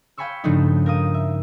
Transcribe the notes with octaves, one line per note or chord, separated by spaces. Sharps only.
F5 G5 G#5 B5 C#6 E6
G2 C#3 F3 A3 D4 D#4
A#4 F5 D#6
E5